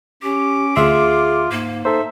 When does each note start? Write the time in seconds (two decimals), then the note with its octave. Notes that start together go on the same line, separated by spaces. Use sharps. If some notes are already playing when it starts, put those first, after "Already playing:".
0.23 C#4 G4 D6
0.76 D2 F4 G#4 E5 C6
1.52 G#2 A#3
1.85 D#4 A4 C5 E5